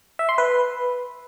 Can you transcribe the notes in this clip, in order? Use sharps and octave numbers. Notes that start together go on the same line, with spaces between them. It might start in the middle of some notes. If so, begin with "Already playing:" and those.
E5
C6
B4